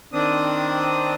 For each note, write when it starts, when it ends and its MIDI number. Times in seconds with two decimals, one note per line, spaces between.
0.13 1.15 51
0.13 1.15 60
0.13 1.15 62
0.13 1.15 87